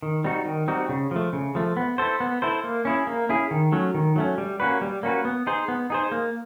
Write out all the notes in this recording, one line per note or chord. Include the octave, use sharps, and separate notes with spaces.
D#3
G3 C4 D#4 F#4
D#3
G3 C4 D#4 F#4
C#3
F3 A3
C#3
F3 A3
B3
E4 A4 C5
B3
E4 A4 C5
A#3
C#4 E4 G#4
A#3
C#4 E4 G#4
D#3
F#3 A3 C#4
D#3
F#3 A3 C#4
G3
A#3 C#4 F#4 B4
G3
A#3 C#4 F#4 B4
B3
D#4 G#4 C5
B3
D#4 G#4 C5
A#3